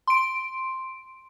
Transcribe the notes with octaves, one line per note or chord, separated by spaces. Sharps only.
C6 D7